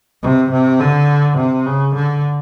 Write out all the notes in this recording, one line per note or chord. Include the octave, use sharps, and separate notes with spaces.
C3
C3
D3
C3
C#3
D3